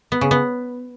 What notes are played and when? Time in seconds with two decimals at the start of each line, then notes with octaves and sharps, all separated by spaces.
0.12 B3
0.21 C#3
0.31 B3